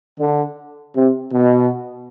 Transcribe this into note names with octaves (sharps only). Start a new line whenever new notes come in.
D3
C3
B2